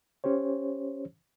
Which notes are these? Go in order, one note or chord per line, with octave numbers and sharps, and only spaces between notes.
C#4 G4 C5 C#5